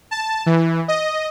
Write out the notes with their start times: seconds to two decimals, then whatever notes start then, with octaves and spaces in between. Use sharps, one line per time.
0.11 A5
0.46 E3
0.88 D#5